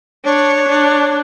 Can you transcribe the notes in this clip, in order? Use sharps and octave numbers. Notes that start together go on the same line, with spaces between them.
D4 C#5
D4